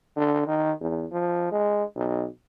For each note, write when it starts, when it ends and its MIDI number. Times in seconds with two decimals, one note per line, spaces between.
0.17 0.43 50
0.47 0.72 51
0.80 1.06 40
1.12 1.51 53
1.51 1.83 56
1.96 2.26 35